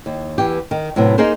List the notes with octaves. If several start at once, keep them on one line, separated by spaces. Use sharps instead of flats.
D#2
E2 E3 G4
D#3
A2 C3 F#3 B3
A#3 D#4 G#4 A#4 C5